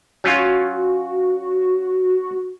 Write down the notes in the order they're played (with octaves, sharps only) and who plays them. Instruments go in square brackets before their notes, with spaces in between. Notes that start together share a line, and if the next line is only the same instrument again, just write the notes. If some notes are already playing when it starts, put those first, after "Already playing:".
[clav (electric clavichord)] F#3 C#4 F4 [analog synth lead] F#4